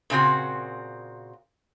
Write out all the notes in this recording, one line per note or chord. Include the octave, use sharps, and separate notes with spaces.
A#2 C#3 C4 F#4